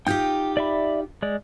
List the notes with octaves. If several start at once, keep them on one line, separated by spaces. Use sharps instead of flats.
D#4 F4 G4 G5 G6
D5 E5 B5
G#3 D5